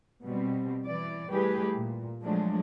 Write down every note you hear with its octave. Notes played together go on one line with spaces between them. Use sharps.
B2 G3 C4
E3 D5
E3 G3 A3 G4 G#4 B4
A#2
F3 F#3 G#3 A3 D4